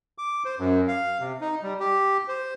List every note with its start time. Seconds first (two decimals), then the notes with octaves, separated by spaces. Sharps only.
0.18 D6
0.45 C5
0.59 F#2
0.88 F5
1.20 C3
1.41 D#4
1.63 G3
1.80 G4
2.28 C5